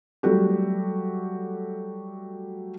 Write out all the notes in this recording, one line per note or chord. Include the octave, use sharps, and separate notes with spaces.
F#3 G3 A3 F#4 G4